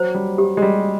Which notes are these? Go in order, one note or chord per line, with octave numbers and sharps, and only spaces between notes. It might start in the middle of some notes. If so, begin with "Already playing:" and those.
Already playing: F#3 C5
G3
G4
G#3
G3